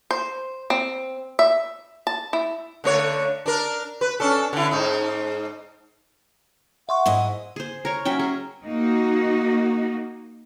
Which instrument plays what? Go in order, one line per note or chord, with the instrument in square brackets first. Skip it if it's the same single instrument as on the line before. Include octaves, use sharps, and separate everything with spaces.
[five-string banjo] C5
C4
E5
A5
E4
[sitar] D3 A3 C#5
D4 A#4
B4
C#4 D4 A4
D3 E4
G#2 D#4
[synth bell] E5 C6 C#6 [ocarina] F#5
[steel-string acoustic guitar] G#2 E4 D#5
[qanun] G#4 C5
A#4 C#5
F#3 C#4 E5 G5
G#4
[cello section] A#3 D#4 F#4